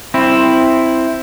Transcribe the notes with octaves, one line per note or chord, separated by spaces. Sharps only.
C4 E4